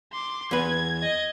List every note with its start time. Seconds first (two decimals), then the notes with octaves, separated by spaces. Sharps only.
0.12 C6 D6
0.51 E2 B4 G#6
0.98 D#5 G#6